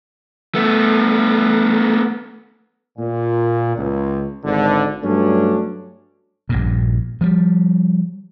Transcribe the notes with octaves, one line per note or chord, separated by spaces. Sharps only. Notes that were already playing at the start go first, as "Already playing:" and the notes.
A3 B3
A#2
C#2
G#1 D3
G2 F#3 A3 C#4 D4
A#1 G2 A#2
F3 G3